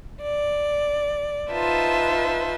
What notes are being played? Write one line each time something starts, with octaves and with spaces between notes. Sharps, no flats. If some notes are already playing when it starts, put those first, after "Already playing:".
D5
D#4 F4 B4 C5 E5 A5